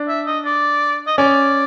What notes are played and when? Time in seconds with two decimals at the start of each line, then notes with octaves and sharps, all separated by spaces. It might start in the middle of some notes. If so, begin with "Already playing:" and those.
Already playing: D4
0.08 E5
0.27 D#5
0.45 D5
1.07 D#5
1.18 C#4 D5